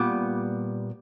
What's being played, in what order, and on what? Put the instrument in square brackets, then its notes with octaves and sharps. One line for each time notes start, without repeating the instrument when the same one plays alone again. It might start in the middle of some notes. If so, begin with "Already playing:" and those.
Already playing: [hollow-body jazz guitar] A#2 G3 B3 D5